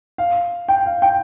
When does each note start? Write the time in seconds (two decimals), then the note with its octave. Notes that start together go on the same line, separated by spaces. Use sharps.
0.18 F5
0.69 G5
0.86 F5
1.02 G5